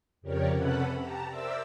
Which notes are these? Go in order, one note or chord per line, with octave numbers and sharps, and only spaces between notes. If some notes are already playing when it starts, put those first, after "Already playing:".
F2 C#3 G4 A#4 C#5 D5
C3 C#4 A4 B4 F#5 B5
G4 A5 A#5
A#4 C5 D5 E5 D6 E6